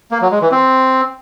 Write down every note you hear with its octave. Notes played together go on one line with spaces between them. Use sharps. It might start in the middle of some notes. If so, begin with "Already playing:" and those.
A#3
F#3
G#3
E3
C4